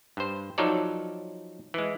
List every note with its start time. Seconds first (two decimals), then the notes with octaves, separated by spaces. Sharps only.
0.17 G2 C5
0.58 F3 F#3 D#4 A4 C#5 D5
1.74 E3 G#3